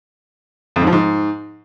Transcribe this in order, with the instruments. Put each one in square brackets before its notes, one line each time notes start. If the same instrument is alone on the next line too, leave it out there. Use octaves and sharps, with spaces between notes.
[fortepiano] F2
G#2
F3
G#2